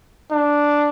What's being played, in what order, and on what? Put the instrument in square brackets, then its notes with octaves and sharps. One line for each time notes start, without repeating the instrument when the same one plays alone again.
[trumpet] D4